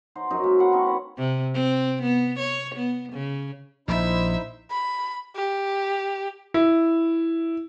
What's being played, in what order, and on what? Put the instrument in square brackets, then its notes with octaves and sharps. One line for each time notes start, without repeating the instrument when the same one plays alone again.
[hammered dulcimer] D#4 C5 F#5
F#2 D#4 A#4
G#3 A#3 E5
E4 C5 F#5
A#3 C4 D#4 C#6
C#4 B4
[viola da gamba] C3
C4
B3
C#5
B3
C#3
[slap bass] A#1 [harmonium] D#4 E4 C5 [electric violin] E5
[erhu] B5
G4
[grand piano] E4